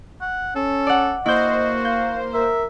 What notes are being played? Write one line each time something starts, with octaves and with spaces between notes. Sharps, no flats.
F#5
C#4 A4
D5 F#5
A#3 E4 F#4 C5 D#5 G6
F5 G6
A#4 E5